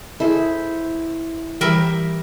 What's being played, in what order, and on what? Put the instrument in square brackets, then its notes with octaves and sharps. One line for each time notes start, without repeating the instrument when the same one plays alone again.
[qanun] E4 C5 [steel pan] G#4 A4
[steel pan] E3 [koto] G3 A#4 E5